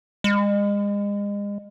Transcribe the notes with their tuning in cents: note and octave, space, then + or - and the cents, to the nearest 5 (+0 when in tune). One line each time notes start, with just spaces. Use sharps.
G#3 -35